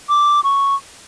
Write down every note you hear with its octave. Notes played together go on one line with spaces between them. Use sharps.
D6
C#6